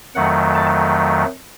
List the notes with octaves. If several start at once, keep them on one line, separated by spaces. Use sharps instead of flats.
F2 D#3 F#3 A3 F#5
A5